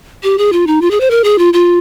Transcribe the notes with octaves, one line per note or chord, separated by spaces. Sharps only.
G4
G#4
F4
D#4
F4
G#4
C5
A#4
G#4
F4
F4